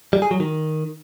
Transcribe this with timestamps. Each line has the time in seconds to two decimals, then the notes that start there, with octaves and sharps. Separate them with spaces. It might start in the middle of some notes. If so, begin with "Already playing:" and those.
0.13 G3
0.22 G#4
0.31 F#3
0.40 D#3